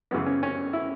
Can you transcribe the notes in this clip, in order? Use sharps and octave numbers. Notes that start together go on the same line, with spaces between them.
F#2 C#3 E3 B3
C#4
C#4
E4